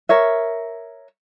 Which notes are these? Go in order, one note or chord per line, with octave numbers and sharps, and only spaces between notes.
A#4 C#5 E5